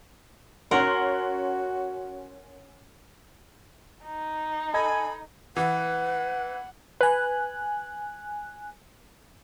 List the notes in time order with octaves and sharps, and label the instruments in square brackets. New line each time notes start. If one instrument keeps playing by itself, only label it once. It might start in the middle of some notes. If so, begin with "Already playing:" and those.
[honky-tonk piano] C#4 F#5 C6 [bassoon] F#4 [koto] A#4
[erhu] D#4
[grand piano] A4 D#5 G#6 [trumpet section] G#5 [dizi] B5
[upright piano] E3 [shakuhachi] B4 [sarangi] F#5
[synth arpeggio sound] B4 [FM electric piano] G#5 F#6